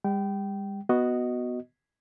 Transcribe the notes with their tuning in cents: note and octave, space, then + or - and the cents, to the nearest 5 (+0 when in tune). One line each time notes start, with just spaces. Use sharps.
G3 +40 G5 -20
B3 -5 F#4 +0 D#5 +0